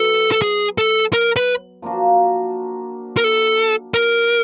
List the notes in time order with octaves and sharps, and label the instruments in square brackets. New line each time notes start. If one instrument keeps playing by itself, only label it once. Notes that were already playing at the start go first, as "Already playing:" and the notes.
Already playing: [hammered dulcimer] F#3 B3 [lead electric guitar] A4
[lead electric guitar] A4
G#4
A4
A#4
B4
[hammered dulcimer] F3 A#3 D4 F#4
[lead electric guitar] A#4
A4
A#4